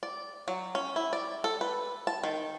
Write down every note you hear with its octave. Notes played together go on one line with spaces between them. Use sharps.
D5
F#3
C#4
E4
D5
A4
B4
A5
D#3